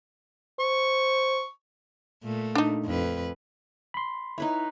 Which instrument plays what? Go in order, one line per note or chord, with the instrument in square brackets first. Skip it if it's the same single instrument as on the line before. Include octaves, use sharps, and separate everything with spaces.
[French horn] C5 [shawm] C#6
[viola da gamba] A#2 A3
[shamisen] D4 D#4
[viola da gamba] F2 B4
[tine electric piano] B5 C6
[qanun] D#4 B4 C#5 [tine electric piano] E4